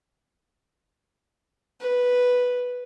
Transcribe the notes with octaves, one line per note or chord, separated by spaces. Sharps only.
B4